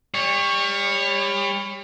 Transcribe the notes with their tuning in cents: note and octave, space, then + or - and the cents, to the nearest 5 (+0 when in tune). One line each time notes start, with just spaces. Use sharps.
G3 +30 C#5 +0